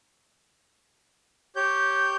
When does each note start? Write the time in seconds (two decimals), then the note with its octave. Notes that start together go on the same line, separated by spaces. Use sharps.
1.56 G4 C#5 G6